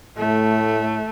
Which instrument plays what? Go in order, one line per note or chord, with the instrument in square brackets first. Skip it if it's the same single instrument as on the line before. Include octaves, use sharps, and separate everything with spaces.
[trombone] A2 [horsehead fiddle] A3